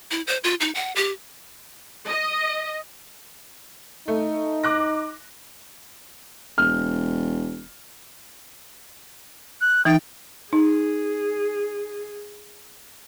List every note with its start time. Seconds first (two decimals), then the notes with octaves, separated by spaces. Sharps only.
0.11 E4
0.27 C5
0.44 F4
0.60 D#4
0.75 F#5
0.96 G4
2.07 D#5
4.08 A3 D#4
4.63 D6 F#6 A#6
6.58 E1 F6
9.61 F#6
9.85 E3 D#4 G5 A6
10.53 D#4 G#4